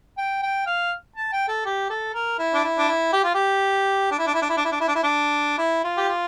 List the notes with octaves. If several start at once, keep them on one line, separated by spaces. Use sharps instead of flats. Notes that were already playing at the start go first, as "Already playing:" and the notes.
G5
G5
F5
A5
G5
A4
G4
A4
A#4
E4
D4
E4
D4
E4
G4
F4
G4
D4
E4
D4
E4
D4
E4
D4
E4
D4
E4
D4
E4
D4
E4
F4
G4
F4